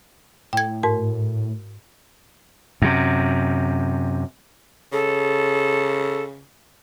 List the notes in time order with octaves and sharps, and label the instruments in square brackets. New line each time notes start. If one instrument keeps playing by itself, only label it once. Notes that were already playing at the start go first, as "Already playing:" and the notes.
[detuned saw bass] A2 [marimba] G5 G#6
[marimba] G#2 A#4 C6
[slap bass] F#2 C3
[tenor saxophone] C#3 [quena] A4